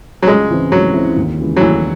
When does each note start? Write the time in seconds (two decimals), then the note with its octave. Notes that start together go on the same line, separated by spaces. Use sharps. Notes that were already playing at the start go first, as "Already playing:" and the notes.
0.22 F#3
0.27 C#2 G#3
0.50 C#3 E3 C4 E4
0.72 C#2 F#3
0.94 C#3 E3 C4 E4
1.17 D#2
1.39 C#3 E3 G#3
1.56 F#3
1.60 D#2 E3